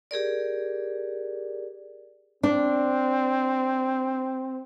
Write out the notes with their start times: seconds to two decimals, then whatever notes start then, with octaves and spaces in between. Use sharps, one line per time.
0.11 G4 G#4 A#4 D5
2.43 C4 D4